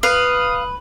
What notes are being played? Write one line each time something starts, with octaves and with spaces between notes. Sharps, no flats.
B4 F5 D#6